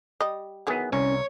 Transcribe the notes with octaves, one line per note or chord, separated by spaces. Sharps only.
G3 D#5
D#3 E3 F#3 B3 G#4
C2 C#4 C#5